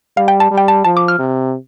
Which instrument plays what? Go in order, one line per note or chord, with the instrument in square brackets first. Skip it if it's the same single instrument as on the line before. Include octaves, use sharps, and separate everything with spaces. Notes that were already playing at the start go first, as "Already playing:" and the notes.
[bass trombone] G3 [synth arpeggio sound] F5
[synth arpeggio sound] G5
A5
[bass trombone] G3
[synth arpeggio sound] G5
A5
[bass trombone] F3 [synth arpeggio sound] A5
[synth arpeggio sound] D6
F6
[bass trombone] C3